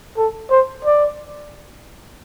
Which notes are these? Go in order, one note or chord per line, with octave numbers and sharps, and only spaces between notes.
A4
C5
D5